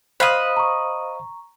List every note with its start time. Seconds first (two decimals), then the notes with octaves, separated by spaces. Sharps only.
0.20 C5 D#5 F5 B5 F#6
0.57 A#5 C#6